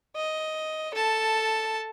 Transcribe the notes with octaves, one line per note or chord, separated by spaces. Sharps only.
D#5
A4 A5